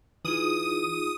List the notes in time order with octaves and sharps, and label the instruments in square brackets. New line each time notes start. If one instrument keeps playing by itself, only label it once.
[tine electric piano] E3 [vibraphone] D#4 F4 G#4 [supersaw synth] D#6